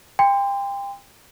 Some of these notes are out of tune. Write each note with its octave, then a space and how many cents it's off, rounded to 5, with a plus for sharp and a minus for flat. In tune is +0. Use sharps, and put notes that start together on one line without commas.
G5 +30 C6 -25